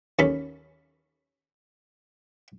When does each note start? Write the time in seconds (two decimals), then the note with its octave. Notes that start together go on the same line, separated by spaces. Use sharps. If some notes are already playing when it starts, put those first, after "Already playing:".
0.19 D#2 C#4 A4 B5